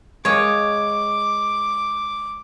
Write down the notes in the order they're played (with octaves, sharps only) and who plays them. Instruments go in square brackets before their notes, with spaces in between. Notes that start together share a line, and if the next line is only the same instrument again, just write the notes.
[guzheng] G#3 F4 D#5 [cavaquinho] C#5 [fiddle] D6